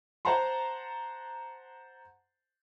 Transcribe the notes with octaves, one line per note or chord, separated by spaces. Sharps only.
C5 F#5 A5 A#5 C6